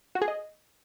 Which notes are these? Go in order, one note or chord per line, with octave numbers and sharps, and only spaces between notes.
F#4
G#4
D#5